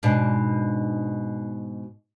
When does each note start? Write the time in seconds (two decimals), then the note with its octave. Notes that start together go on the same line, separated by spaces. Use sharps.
0.03 G#2 B2 D4